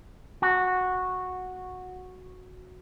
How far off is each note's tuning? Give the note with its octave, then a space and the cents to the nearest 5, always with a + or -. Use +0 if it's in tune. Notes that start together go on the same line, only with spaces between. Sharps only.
F#4 -10